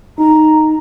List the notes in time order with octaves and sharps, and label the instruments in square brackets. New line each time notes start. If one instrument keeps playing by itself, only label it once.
[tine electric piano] D#4 [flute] A#5